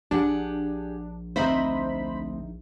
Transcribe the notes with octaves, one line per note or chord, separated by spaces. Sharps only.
A#1 D4 G4 G#4 F#5
D2 C4 D#4 C5 D#5 E5 B5